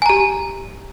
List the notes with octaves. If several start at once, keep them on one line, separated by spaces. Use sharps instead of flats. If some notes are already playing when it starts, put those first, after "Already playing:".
G4 G#5 A#5